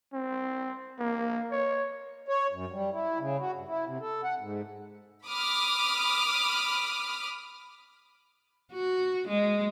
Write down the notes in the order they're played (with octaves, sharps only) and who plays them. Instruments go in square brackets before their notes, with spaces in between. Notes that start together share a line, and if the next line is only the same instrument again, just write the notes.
[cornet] C4
A#3
C#5
[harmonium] C#5
F#2
G3
E4
C#3
F#4
G2
E4
C3
A4
F#5
G#2
[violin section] B5 D6 D#6 F6
[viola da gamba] F#4
G#3